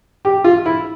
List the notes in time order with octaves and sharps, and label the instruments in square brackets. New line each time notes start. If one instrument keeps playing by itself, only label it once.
[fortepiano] G4
F4
E4